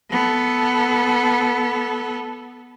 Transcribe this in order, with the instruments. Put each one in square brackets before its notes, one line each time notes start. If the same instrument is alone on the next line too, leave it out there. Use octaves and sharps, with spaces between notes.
[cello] B3 A4